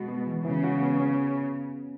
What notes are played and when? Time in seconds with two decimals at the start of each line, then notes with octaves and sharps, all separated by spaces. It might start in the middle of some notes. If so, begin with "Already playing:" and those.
Already playing: B2 G#3 F#4
0.08 B3
0.27 E3
0.45 C#3 E3
0.64 F#4
0.82 B3
1.00 C#4